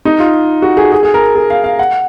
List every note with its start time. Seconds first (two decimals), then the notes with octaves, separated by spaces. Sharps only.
0.05 D#4
0.20 F4
0.62 F#4
0.77 G#4
0.92 G#4
1.03 G#4
1.14 A#4
1.35 G#4
1.50 F5
1.64 F5
1.79 F#5